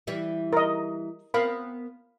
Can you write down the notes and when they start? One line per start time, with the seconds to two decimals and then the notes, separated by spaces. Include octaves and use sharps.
0.07 E3 G3 E4
0.53 A#4 D#5
1.34 B3 C4 A#4 F5 B5